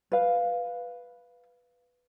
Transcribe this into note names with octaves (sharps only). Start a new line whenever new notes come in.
B4 F5